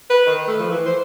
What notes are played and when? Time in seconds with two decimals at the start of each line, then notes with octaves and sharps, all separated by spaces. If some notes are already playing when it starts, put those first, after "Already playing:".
0.10 B4
0.27 D#3
0.48 A3
0.60 F3
0.71 E3
0.85 C5